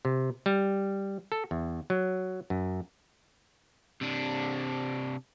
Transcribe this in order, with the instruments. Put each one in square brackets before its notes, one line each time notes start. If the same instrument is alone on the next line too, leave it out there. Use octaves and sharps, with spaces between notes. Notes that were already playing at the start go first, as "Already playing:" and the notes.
[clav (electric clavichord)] C3
G3
A4
E2
F#3
F#2
[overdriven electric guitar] C3 D4